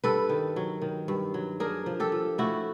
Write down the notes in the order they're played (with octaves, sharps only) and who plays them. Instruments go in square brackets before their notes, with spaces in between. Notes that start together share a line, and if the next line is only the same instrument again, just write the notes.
[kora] G2 A4 B4
D#3
F#3
D#3
G2
F#3
D4 G#4 A#4
F3
G4 A4
F3
A3 E4 F#4